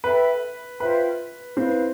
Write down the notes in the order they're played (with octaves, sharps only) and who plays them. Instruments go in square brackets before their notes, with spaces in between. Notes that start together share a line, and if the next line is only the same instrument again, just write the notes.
[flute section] A4 E5 G5 B5 [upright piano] B4
[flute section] F4 C5 E5 G5 [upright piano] B4
[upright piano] C4 [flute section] E4 B4 F5